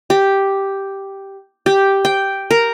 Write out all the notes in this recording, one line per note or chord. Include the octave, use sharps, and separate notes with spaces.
G4
G4
G5
A#4